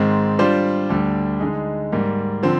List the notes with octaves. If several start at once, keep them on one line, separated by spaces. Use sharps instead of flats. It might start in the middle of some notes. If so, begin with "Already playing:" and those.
Already playing: G#2 D#3 G#3 C4
G3 D4 F4 C5
D2 D3 G3 D4
D3 G#3 D#4 G#4
G#2 G3 A#3
D3 F3 C4